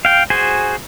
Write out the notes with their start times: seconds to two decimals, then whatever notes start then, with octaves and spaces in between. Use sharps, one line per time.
0.05 F5 G5
0.30 F#4 G#4 C5 G#5